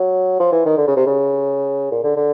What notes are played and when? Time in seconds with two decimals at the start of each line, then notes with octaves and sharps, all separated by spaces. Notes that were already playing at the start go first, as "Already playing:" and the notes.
Already playing: F#3
0.40 F3
0.52 E3
0.65 D#3
0.78 D3
0.88 C#3
0.96 C3
1.06 C#3
1.91 A#2
2.04 D3
2.16 D3